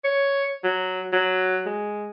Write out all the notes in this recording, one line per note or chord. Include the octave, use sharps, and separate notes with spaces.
C#5
F#3
F#3
G#3